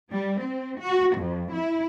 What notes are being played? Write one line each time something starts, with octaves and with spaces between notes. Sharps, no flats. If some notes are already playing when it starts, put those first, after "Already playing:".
G3
C4
F#4
F2
E4